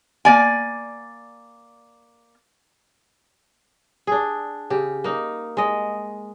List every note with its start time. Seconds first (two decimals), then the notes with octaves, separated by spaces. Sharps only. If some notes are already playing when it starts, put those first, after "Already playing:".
0.25 A#3 D5 G#5
4.07 D4 G#4
4.70 C#3 G4
5.04 A#3 D#4
5.57 G#3 D#5